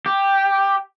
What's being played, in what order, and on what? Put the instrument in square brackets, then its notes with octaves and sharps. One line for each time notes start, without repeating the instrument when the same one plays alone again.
[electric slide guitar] G4